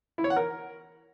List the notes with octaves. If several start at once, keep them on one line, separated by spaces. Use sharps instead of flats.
E4
C#5
F#5
A#4